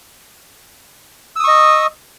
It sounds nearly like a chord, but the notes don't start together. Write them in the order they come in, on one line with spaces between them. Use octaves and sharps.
E6 D#6 C#6 D#5